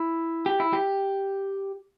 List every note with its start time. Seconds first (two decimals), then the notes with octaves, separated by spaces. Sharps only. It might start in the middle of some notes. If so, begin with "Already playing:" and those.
Already playing: E4
0.46 G4
0.60 E4
0.73 G4